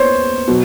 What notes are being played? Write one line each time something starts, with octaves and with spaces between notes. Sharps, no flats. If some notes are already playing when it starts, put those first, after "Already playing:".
Already playing: B3 C5 C#5
B2 F#3